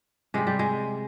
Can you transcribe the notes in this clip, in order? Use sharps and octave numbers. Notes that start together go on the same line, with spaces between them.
C3 G3 G#3
G3
G#3